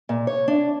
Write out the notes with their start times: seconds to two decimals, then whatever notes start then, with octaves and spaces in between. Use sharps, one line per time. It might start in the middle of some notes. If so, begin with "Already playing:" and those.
0.09 A#2
0.27 C#5
0.48 D4